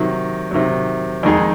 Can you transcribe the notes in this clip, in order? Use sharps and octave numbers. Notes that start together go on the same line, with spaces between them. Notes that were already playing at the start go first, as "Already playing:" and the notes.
Already playing: C3 D#3 F#3
C3 D#3 F#3
F2 D#3 G#3 D#4 G#4